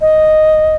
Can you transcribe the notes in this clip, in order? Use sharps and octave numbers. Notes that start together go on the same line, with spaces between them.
D#5